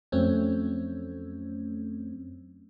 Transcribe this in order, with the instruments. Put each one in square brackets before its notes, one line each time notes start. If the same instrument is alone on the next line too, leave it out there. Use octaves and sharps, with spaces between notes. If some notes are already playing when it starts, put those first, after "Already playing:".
[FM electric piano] F2 F#3 A3 C4 C#4